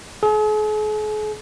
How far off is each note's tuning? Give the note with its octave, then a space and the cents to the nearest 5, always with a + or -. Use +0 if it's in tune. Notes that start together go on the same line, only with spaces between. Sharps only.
G#4 +45